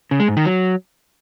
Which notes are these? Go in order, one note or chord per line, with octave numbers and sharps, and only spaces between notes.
C#3
G#3
G#2
D#3
F#3